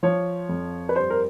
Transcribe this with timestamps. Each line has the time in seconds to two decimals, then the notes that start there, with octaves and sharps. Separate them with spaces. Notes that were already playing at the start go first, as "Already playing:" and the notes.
0.03 F3 C#5
0.49 F2
0.89 B4
0.96 G2 C5
1.10 A#4